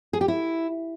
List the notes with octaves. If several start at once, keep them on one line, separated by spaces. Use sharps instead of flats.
G#4
G4
E4